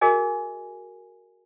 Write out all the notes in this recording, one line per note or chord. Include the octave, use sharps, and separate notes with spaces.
F#4 G#4 A#4 D#5 G#5